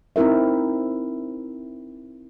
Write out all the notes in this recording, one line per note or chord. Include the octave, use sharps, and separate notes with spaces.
C4 D#4 E4 A#4 E5